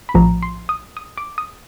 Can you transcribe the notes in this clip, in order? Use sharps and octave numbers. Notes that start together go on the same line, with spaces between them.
B5
A#1 A2 F3 A#5
C6
D#6
D#6
D6
D#6